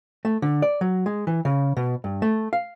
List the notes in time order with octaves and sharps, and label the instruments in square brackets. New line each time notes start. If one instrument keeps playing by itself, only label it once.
[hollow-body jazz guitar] A3
D3
D5
F#3
G#3
E3
C#3
B2
G2
A3
F5